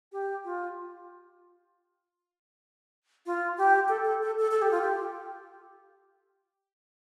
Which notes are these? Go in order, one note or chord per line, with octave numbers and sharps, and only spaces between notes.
G4
F4
F4
G4
A4
A4
A4
A4
A4
G4
F4
G4